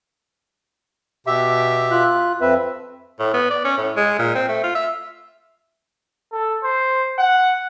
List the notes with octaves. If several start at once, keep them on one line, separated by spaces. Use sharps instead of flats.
B2 G4 E5
F4 F#6
F2 C4 B4 E5
A2
B3
D5
C#4
A2
G#3
A#2
C4
A3
F4
E5
A4
C5
F#5